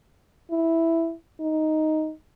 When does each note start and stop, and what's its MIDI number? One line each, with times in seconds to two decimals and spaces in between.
0.51 1.13 64
1.41 2.12 63